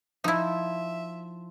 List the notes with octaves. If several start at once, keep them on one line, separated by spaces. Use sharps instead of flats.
F3 D#4 E4 E5